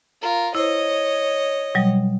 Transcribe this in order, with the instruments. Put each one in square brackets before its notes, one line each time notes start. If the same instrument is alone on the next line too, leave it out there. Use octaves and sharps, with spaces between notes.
[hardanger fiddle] F4 A#4
[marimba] E4 C5 [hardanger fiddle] C#5 D#5
[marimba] B2 F#3 G3